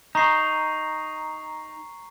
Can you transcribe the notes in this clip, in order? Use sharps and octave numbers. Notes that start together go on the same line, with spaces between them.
D#4 A#5 C#6 C7